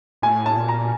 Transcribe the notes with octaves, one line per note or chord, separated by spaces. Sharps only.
A2 G#5
A5
A#2
A#5